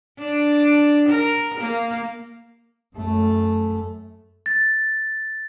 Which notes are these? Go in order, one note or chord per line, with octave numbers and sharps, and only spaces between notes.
D4
A#4
A#3
F#2 A3
A6